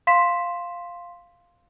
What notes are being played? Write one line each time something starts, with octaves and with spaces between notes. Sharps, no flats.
F5 C6 B6 E7